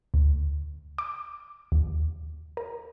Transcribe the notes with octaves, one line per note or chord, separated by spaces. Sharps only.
D2
D6
D#2
A#4